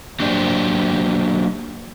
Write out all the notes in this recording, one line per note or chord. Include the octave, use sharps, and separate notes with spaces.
F#3 A#3 D4 G4 C5 D5